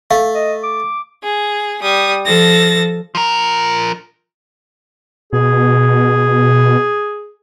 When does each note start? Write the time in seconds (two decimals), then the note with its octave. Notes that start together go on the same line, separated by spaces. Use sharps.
0.11 A3 F5
0.35 D#5
0.63 D6
1.23 G#4
1.82 G3 D#6
2.26 F3 A4 A6 A#6
3.15 F3 A#4
5.33 B2 G#4